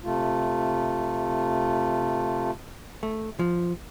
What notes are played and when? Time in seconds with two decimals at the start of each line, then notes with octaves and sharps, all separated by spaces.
0.04 C3 A3 F4
3.03 A3
3.39 F3